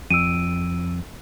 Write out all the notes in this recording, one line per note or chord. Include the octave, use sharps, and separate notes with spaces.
F2 E6 D7 D#7